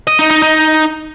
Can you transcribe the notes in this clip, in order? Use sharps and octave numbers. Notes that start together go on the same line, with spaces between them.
D#5
D#4
D#4
D#4